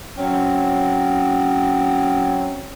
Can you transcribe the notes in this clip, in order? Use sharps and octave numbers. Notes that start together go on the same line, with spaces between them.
F#3 C4 C#4